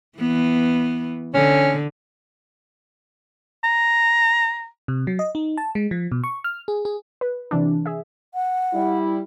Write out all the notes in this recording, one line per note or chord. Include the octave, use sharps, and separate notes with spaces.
E3 B3
D3 C#4
A#5
C3
F#3
D#5
D#4
A5
G#3
F3
B2
C#6
F6
G#4
G#4
B4
C3 E3 D4
G#4 E5
F#5
G3 E4